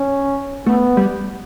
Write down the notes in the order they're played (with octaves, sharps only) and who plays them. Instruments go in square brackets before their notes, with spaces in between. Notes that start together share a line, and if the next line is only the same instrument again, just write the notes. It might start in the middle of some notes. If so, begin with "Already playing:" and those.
Already playing: [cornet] C#4
[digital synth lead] A3 [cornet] B3
[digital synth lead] G3